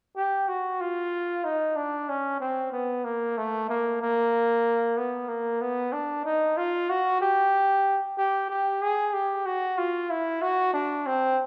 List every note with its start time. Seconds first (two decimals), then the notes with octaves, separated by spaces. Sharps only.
0.16 G4
0.48 F#4
0.81 F4
1.44 D#4
1.76 D4
2.09 C#4
2.40 C4
2.72 B3
3.04 A#3
3.37 A3
3.69 A#3
4.01 A#3
4.97 B3
5.28 A#3
5.61 B3
5.92 D4
6.25 D#4
6.57 F4
6.89 F#4
7.21 G4
8.18 G4
8.50 G4
8.82 G#4
9.13 G4
9.46 F#4
9.78 F4
10.10 E4
10.42 F#4
10.74 D4
11.06 C4